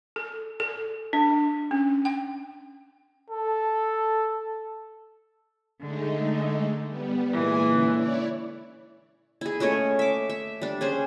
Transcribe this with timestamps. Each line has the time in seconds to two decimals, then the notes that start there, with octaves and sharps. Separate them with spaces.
0.16 A4
0.60 A4
1.13 D4
1.71 C#4
2.05 G5
3.30 A4
5.81 D3 G#3 A3 D#4
6.87 G3 B3
7.33 A#2 E3 G#3 G#5
7.66 D3 C#4
7.97 E4 C#5 D5
9.41 E4 G#4
9.60 A3 C#4 C#5 D#5
9.99 E5 D6
10.30 E5
10.62 G3 D4
10.81 C#4 G#4 C5